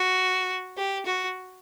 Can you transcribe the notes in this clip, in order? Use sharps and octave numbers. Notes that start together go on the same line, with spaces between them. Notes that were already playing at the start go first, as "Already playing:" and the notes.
Already playing: F#4
G4
F#4